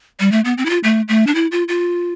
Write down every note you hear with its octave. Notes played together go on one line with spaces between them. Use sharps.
G3
A3
B3
C4
E4
F4
A3
A3
D4
E4
F4
F4